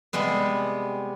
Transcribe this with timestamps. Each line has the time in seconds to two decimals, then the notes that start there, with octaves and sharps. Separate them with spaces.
0.13 C3 G3 G#3 B3